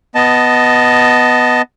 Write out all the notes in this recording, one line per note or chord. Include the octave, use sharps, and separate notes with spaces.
B3 D#5 A5